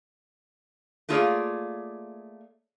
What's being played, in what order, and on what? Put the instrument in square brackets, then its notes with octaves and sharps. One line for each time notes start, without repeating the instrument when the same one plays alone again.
[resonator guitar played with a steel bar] A3 A#3 F4 G#4 C#5 D5